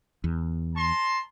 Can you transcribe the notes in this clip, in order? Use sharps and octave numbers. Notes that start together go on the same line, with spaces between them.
E2
A5 A#5 C6